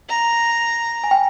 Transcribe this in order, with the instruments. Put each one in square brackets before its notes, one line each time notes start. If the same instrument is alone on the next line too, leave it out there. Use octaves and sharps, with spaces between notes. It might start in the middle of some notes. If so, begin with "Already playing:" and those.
[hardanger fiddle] A#5
[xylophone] G#5
G5